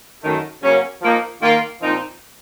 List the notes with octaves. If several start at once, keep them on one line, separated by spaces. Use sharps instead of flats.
F#2 D#3 A3
C#3 F#3 A#3 C#4
F3 A#3 D#4
D#3 A#3 F4
A#2 F3 C4 D#4